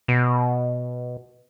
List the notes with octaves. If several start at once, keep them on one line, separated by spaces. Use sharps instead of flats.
B2